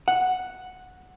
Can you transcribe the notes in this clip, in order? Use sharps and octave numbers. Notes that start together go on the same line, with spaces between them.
F#5